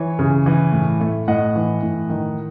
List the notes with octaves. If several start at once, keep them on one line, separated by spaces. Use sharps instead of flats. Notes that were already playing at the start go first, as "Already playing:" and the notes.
Already playing: E3 C#5
C#3
E3
A2
A3
A2 D#5 F#5
E3
A2
D#3